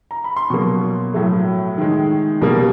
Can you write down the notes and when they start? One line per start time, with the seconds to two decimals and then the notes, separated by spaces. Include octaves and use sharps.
0.11 A#5
0.24 B5
0.36 C6
0.50 B2 F#3 A#3 C#6
1.14 A2 F#3 A3
1.78 D#3 G#3
2.41 B2 G3 A#3